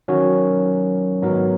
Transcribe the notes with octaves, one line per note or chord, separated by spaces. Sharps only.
D#3 F#3 C#4 F#4
G#2 F#3 B3 D#4 A#4